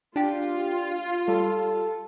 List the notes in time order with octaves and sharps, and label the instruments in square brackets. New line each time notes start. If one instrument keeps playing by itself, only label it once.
[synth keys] D4 G4 [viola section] F4
[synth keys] G3 [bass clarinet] A4